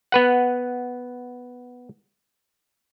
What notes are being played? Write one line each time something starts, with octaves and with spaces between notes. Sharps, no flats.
B3 B4 F#5